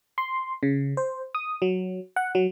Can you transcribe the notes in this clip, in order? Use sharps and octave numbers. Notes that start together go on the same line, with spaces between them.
C6
C#3
C5
D#6
F#3
F#5
F#3